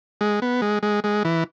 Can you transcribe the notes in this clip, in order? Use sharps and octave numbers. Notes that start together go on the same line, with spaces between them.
G#3
B3
G#3
G#3
G#3
E3